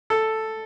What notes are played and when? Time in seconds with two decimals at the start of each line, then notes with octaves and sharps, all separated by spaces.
0.10 A4